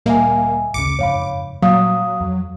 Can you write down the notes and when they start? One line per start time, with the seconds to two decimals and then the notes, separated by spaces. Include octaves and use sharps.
0.06 D2 A#2 G3 A#3 D#5 E5 G#5
0.74 G#1 D2 C#3 D6 C#7
0.99 F#1 F2 G#2 C#5 F5 B5
1.62 A#2 F#3 G3 F5 D#6
2.21 F2